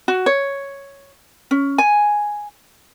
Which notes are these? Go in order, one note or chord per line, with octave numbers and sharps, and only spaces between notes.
F#4
C#5
C#4
G#5